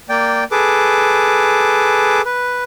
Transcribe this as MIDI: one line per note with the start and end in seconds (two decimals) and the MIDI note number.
0.09 0.44 58
0.09 0.44 74
0.09 0.44 79
0.52 2.21 68
0.52 2.21 69
0.52 2.21 71
0.52 2.21 86
2.25 2.64 71